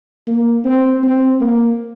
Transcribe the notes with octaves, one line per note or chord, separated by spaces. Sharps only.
A#3
C4
C4
A#3